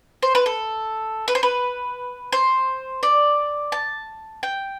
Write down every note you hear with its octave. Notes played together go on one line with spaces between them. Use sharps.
C5
B4
A4
B4
C5
B4
C5
D5
A5
G5